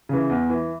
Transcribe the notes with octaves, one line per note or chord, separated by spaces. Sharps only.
C#3 E3
E2
E3